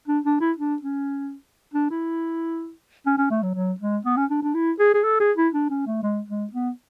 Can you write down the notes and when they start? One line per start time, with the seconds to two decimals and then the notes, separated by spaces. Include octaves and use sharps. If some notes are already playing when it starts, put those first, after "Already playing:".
0.08 D4
0.25 D4
0.40 E4
0.58 D4
0.82 C#4
1.74 D4
1.90 E4
3.06 C#4
3.18 C#4
3.30 A3
3.42 F#3
3.55 F#3
3.80 G#3
4.05 B3
4.16 C#4
4.30 D4
4.42 D4
4.54 E4
4.79 G#4
4.94 G#4
5.04 A4
5.20 G#4
5.37 E4
5.54 D4
5.70 C#4
5.86 A3
6.03 G#3
6.28 G#3
6.53 B3